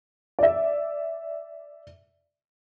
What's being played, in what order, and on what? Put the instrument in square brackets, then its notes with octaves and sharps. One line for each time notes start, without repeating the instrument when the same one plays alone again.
[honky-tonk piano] D5 E5